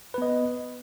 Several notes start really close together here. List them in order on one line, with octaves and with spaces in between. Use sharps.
B4 B3 D#5